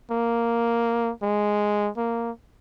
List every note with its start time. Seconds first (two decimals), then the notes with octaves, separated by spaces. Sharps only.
0.11 A#3
1.23 G#3
1.97 A#3